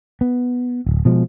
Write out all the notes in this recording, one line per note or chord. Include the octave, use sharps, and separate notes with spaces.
B3
D1
B2 F3 G#3